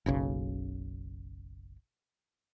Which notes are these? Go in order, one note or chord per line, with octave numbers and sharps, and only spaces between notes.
F#1 B1 C#3